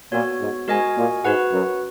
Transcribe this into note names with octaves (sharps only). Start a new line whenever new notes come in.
A#2 B3 F#4 C#5
G#2
G#2 F#4 A#4 D#5 G#5
A#2
G#2 F#4 B4 F#5
F#2